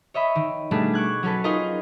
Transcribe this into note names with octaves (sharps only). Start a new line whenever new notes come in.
C#5 D#5 E5 B5
D#3
B2 G3 A3 D4 G#4 B4
C#6 D6 F#6 G#6
F#3 C#4 A4 B4
D#4 F4 G#4 A#4 B4 D#5